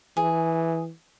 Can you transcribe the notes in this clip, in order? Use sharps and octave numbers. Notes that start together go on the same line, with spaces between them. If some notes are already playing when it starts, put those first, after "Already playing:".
E3 G#4